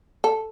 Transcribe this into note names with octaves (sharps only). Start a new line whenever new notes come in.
A4